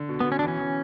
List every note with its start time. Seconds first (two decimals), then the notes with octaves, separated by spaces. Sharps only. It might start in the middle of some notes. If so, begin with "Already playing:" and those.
Already playing: D3
0.09 B2
0.20 B3
0.26 B2
0.32 C#4
0.39 D4
0.42 E3
0.48 C#4
0.59 E3